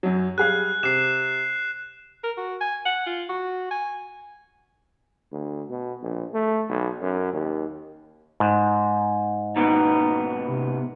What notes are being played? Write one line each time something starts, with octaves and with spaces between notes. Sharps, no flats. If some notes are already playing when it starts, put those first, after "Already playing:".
F#2 F#3
G3 G#4 F5 F#6
C3 C7 E7
A#4
F#4
G#5
F#5
F4
F#4
G#5
D2
B2
A#1
A3
B1
F#2
D#2
G#2
D#2 B2 B3 D#4
C3